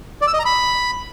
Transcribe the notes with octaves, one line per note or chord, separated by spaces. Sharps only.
D5
E6
D#5
A#5
B5